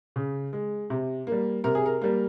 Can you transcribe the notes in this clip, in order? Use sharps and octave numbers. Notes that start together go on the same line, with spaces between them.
C#3
G#3
C3
A#3
G3
C3 A#4
G#4
A#4
G3 A#3